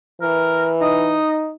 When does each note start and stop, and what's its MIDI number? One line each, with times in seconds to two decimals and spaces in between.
0.22 1.19 52
0.22 0.70 70
0.81 1.53 63
0.81 1.39 75